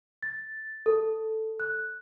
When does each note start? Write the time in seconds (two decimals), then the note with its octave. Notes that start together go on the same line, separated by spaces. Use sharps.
0.23 A6
0.86 A4
1.60 F#6